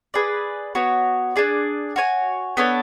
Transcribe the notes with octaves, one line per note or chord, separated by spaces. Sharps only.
G#4 B4 D5
B3 F#4 C#5
D4 G#4 D5
F#4 C#5 G#5
B3 D4 A4 C#5